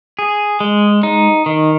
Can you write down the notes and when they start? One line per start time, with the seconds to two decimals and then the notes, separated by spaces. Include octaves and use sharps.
0.19 G#4
0.60 G#3
1.03 D#4
1.46 D#3